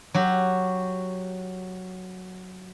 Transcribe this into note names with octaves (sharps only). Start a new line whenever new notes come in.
F#3 F#4 G4